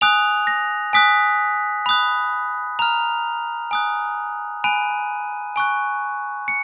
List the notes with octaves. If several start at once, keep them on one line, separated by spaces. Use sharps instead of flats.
G#5 D#6 F#6 F7
A#6
G#5 D#6 F#6 B6
B5 D#6 F#6
A#5 F6 F7
G#5 D#6 F#6
G#5 B5 F#6 D#7
G#5 C#6 F#6
C#7